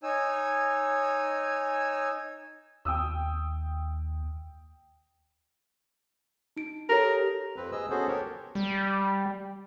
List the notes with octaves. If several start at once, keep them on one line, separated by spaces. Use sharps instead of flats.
D#4 C#5 G#5 E6
D#2 G5 D#6 E6
D#4 D7
G4 A4 A#4 C#5
F2 C4 B4
G#4 D#5 E6
B3 C#4 F#4 G#4 A4 C5
G4 A4 A#4 C#5
G3